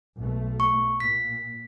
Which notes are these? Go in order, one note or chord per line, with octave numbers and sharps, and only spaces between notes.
B1 A3
C#6
A#2 B6